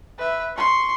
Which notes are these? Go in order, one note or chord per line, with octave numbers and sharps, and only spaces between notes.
B4 E5
C6 C#6